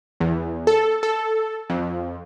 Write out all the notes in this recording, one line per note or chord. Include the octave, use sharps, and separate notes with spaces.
E2
A4
A4
F2